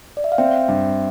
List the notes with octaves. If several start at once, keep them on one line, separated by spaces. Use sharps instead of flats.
D5
E5
F5
C4 E5 G5
G2